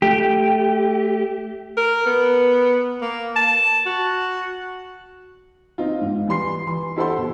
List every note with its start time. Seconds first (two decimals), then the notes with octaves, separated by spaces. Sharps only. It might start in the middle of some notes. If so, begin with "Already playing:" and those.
0.02 A3 G4
1.77 A#4
2.06 B3
3.01 A#3
3.36 A5
3.86 F#4
5.78 C4 D#4 F4
6.01 G#2
6.27 E3 G3 C6 C7
6.67 E3 C6
6.96 E4 G4 A4 C5 F#5 C6
7.18 B2